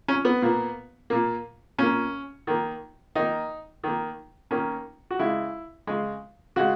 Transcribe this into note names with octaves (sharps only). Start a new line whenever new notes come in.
C#4
B3
A#2 A#3
A#2 A#3
A#2 A#3 C#4
D#3 A#3
D#3 A#3 D#4
D#3 A#3
D#3 A#3 C#4
F#4
C#3 G#3 E4
C#3 G#3
C#3 G#3 F#4